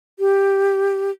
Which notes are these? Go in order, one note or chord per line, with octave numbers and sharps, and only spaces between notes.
G4